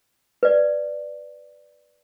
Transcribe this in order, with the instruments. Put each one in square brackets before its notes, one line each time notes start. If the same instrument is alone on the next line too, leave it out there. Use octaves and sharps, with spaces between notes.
[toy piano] B4 D5